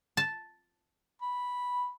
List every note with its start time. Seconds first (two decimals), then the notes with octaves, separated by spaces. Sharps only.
0.17 A5
1.22 B5